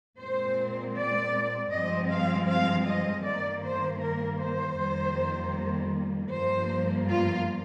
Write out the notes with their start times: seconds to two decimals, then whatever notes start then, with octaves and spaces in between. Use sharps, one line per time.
0.19 A#2 G#3 C4 C5
0.96 D5
1.72 G2 F3 G#3 C4 D#5
2.11 F5
2.50 F5
2.88 D#5
3.25 G2 D#3 A#3 D5
3.64 C5
4.03 A#4
4.40 C5
4.79 F2 D#3 G3 A#3
6.32 G2 F3 A#3 C5
7.09 F4